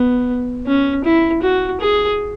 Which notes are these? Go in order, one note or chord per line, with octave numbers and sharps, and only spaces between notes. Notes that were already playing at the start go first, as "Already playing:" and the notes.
Already playing: B3
C#4
E4
F#4
G#4